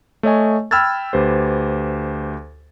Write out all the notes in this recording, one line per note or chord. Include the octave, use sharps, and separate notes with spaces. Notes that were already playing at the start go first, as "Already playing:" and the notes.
A3 C#5 D#5 G#5
G5 B5 E6 F6 G#6 A6
D2 G4 B4 C5